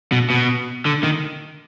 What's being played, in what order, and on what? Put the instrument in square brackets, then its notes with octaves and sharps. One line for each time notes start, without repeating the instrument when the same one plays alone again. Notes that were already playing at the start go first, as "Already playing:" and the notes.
[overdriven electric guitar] B2
B2
D3
D#3